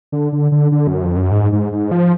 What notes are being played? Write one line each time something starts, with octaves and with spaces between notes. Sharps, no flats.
D3
D3
D3
D3
F#2
F2
F#2
G#2
G#2
G#2
F3